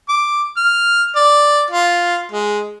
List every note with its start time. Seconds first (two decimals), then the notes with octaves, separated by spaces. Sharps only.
0.09 D6
0.57 F6
1.16 D5
1.71 F4
2.32 G#3